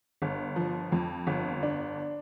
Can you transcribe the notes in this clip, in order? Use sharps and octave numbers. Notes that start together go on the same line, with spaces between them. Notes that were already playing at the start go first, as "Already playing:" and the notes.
G1
F3
F2
G1
D4